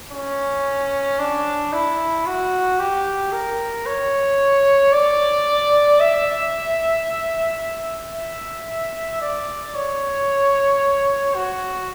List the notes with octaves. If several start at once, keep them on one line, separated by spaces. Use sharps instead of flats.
C#4
D4
E4
F#4
G4
A#4
C#5
D5
E5
E5
D5
C#5
F#4